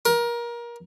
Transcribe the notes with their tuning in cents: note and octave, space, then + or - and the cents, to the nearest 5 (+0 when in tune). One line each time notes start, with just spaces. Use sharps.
A#4 +25